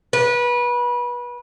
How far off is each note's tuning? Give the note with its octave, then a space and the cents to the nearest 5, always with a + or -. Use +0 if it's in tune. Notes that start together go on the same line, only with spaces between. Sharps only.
B4 -25